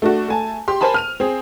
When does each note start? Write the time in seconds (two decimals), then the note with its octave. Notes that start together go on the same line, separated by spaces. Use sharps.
0.02 A3 D4 F#4
0.28 A3 G#5 A5
0.68 G4 C6
0.81 A#4 C5 G#5 A5 B5
0.94 F6 D#7 F7
1.20 C4 G#4